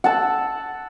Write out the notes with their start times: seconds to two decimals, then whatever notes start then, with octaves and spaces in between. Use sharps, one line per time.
0.04 F#5 A5 E6